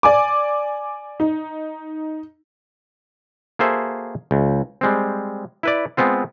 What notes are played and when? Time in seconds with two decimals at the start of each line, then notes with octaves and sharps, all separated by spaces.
0.03 D5 G#5 D6
1.20 D#4
3.59 A#3 F#4 G#4 A4 C5 E5
4.31 C#2
4.81 G3 G#3 C4
5.63 E4 B4 D5
5.97 G#3 B3 C4 F4